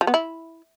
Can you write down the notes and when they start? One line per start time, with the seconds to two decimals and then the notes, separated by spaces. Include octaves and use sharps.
0.01 F3
0.07 B3
0.14 E4